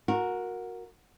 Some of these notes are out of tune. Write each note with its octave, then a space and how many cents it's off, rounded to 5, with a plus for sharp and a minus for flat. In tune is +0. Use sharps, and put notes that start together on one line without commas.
F#4 -20 A#4 +0